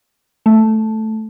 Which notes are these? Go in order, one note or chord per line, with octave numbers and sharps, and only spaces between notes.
A3